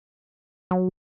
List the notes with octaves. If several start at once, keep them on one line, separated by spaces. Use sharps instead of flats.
F#3